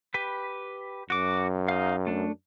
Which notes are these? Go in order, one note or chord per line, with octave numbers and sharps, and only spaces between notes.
G4 B4 B5
F#2 F#4 D6
D#4 F5
A3 D4